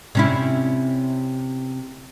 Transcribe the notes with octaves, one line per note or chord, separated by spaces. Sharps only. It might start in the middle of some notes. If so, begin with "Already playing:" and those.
C3 C#4 E4